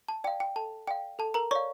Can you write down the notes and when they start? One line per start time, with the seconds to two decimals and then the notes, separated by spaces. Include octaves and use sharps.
0.08 A5
0.24 D5 F5 G5
0.40 G5
0.56 A4 A5
0.87 D5 F5 G5
1.19 A4 A5
1.34 A#4 A#5
1.51 C#5 D5 F5 C#6